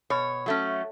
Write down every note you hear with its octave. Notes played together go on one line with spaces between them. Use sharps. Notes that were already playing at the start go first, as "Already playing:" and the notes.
B2 C#5
F#3 A3 C#4